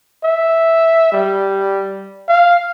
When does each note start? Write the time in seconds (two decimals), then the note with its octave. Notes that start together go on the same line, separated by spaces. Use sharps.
0.23 E5
1.12 G3
2.28 F5